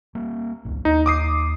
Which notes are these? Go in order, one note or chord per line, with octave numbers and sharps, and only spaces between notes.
G3 A#3
D#1 G#1 C#2
D#2 D#4
D6 D#6 C7